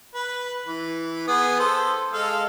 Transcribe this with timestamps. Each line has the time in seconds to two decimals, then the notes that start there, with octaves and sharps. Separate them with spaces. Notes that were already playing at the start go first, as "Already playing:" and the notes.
0.14 B4
0.65 E3
1.27 B3 G#4
1.60 A4 C5
2.13 G#3 A4 F5